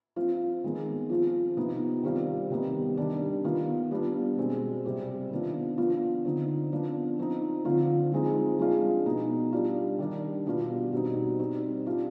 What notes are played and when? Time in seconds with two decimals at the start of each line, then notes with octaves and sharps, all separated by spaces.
0.16 F3 C4 F4
0.64 D#3 G#3 B3
1.10 F3 C4 F4
1.57 C3 F3 B3 D#4
2.03 D#3 G3 C4 F4
2.50 C3 D#3 G3 B3
2.97 D#3 G3 D4
3.44 D#3 B3 F4
3.91 G3 B3 D4 F4
4.37 B2 G#3 C4
4.85 C3 G3 C4
5.31 D#3 B3 D4 F4
5.77 F3 B3 D4 F4
6.25 D3 F3 C4 D#4
6.72 F3 B3 D4 F4
7.19 F3 C4 D#4
7.65 D3 F3 C4 F4
8.12 F3 G#3 C4 D#4
8.59 F3 G#3 D4 F4
9.05 B2 B3 D#4
9.52 G3 D4 F4
9.99 D#3 G3 D4
10.46 B2 G3 B3 D4 F4
10.92 B2 G3 C4 D#4
11.39 G3 C4 D#4
11.86 G3 D4 F4